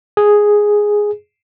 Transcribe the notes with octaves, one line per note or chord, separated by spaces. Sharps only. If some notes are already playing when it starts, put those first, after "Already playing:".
G#4